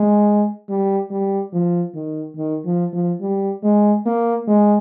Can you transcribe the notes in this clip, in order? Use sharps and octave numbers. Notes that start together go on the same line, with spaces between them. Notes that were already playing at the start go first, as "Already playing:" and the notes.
Already playing: G#3
G3
G3
F3
D#3
D#3
F3
F3
G3
G#3
A#3
G#3